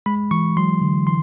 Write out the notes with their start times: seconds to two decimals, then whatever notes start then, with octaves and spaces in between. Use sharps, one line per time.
0.06 G#3 B5
0.31 E3 C#6
0.57 F#3 C6
0.82 D3
1.07 E3 C6